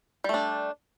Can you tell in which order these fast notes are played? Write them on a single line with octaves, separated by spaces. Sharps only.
G3 A3 D4